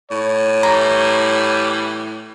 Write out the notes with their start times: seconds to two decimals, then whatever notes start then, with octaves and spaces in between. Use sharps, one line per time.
0.11 A2 C#5
0.63 E3 G3 A#5